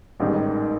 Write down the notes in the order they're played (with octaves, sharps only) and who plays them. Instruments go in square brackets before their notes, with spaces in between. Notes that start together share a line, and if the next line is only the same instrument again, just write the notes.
[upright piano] A1 G#2 D#3 G3